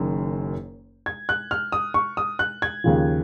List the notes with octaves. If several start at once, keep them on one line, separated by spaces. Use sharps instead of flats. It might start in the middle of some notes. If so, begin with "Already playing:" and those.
Already playing: F#1 F#2 D#3
G#6
F#6
F6
D#6
C#6
D#6
F#6
G#6
D#2 C#3 F3